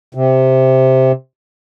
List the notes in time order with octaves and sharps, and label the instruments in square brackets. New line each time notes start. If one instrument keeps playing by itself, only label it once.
[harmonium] C3